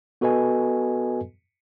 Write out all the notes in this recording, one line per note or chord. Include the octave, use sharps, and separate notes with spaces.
B3 F#4 A4 B4 D#5 G#5